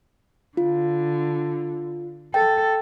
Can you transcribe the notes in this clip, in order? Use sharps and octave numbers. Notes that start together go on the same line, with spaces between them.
D3 F4
A4 G5